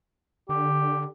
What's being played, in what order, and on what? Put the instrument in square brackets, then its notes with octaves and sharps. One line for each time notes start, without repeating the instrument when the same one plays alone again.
[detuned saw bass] D3 [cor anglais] G4